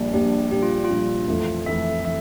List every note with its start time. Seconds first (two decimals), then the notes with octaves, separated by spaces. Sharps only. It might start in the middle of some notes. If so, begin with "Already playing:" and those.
Already playing: A#1 A#2 G3 D4
0.13 A#1 A#2 G3 D4 G4
0.51 A#1 A#2 G3 D4 G4
0.62 F4
0.85 F4
0.90 A#1 A#2 G3 D4
1.28 F2 E3 A3
1.66 F2 E3 A3 E5
2.05 E3 E5